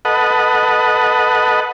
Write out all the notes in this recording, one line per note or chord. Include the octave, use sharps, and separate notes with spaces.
A4 B4 D#5 F#5